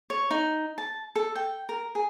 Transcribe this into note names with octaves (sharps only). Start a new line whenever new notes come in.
C#5
D#4
A5
A4
G5
A#4
G#4